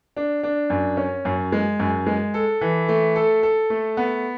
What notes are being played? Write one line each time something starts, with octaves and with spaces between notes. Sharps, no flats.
D4
D4
F#2
C#4
F#2
G#3
F#2
G#3
A4
E3
A3
A4
A4
A3
B3